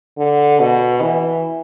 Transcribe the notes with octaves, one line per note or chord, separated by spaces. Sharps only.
D3
B2
E3